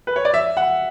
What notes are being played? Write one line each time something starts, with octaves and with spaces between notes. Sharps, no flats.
B4
C#5
D5
E5
F#5